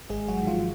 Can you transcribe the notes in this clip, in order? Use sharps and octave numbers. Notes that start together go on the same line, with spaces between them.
G#1 G#3 G#4
F#3 F#4
G#2 D#3
F3 F4